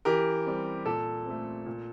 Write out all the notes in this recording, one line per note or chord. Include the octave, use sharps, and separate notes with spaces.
E3 G4 A#4
G3 C4
A#2 A4
A3 C4
A#2